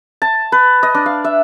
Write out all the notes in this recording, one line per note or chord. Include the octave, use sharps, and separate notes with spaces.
A5
B4
D#5
D4
F5
E5